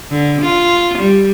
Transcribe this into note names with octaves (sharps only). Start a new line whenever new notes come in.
D3
F4
G3